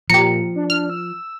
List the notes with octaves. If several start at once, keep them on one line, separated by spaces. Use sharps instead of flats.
A#2 F3 G4 A#5 C#7
D4
D4 F6
E6